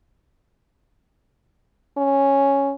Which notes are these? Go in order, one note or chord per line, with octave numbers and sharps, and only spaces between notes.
C#4